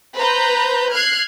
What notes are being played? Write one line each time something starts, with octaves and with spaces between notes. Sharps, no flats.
B4 C5 A#5 G6
F6 F#6 G#6 C7